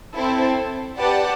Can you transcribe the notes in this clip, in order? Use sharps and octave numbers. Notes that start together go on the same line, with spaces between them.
C4 E4 A4
G4 B4 D5 F#5 A5